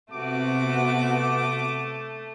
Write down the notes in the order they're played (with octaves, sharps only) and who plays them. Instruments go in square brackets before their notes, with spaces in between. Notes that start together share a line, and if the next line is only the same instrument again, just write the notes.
[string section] C3 B3 F#4 [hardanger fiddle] A3 [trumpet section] D6